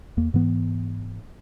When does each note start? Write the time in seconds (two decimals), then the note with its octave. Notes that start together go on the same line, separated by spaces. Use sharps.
0.17 E2 A#3
0.34 G#2 E3 B3